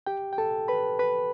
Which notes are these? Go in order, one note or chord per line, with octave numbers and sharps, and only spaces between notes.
G4 G5
G5
A4 A5
B4 B5
B4 B5